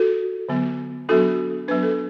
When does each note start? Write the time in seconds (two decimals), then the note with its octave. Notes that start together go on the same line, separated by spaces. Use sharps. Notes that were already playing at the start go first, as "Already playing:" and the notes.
Already playing: F#4 A4
0.49 D3 F#3 B3
1.09 F#3 B3 D4 F#4 A4
1.68 F#3 B3 D4 B4
1.83 A4